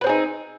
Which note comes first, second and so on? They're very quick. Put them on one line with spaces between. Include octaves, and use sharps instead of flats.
B4 C4 G#4 D#4